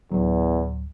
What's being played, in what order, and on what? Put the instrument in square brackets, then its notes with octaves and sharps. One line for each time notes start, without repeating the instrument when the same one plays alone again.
[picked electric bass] D1 F#3 [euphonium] E2